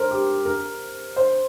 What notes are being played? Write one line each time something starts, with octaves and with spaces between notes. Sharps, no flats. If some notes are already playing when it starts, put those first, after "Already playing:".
Already playing: A#4 C5
G4
A#4
C5